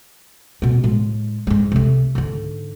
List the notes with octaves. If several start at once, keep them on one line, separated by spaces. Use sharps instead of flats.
B2 B3
A2 G#3
G#2 G#3
C3 A3
G#2 D3